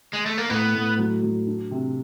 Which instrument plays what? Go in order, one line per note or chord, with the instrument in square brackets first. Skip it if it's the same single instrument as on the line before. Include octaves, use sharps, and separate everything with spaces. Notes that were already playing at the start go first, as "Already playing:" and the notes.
[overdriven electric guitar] G#3
A3
A#3
[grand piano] A2 [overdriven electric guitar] B3
[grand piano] A2
F#3
F#3
D4
C3